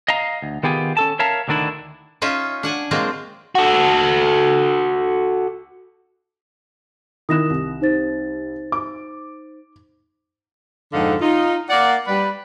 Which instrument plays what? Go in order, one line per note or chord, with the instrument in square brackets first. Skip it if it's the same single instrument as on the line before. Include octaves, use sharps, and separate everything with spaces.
[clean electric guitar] D#5 F5 A#5
D2
D#3 B3 F4 G4 G#4
C#4 A4 A5
A#4 C#5 E5 F5 A5 A#5
D2 D3 D#3 D4 E4
[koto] C#4 D#4 F4 E5
D4 F#5 G#5
F#3 G#3 A#3 C4 F4
[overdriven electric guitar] F#4 A4
[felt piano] D#3 E4 F#6 [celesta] D#6 A#6 E7
[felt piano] C2
[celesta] D#4 C5 A6
[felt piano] D6
[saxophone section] F2 G#2 D3 D#4 F5 F#5
D#4 F4
A#3 D5 F#5
G3 B4 D5